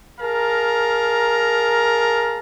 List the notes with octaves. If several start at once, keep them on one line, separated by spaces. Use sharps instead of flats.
G#4 A#4 F5 A5 A#5